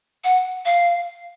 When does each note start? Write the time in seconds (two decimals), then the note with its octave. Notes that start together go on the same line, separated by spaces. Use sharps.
0.24 F#5
0.65 F5